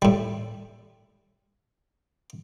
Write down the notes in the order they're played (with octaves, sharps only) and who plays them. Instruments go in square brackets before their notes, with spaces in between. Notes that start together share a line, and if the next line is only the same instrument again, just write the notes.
[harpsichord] A2 G3